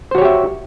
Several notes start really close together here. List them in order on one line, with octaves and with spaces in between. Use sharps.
C5 F#4 C#5 G4 E5